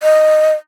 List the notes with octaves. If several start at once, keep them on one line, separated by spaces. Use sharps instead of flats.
D#5